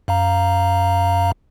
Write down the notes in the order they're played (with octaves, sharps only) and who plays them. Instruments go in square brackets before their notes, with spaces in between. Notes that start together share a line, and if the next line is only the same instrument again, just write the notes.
[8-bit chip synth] F#2 F5 A#5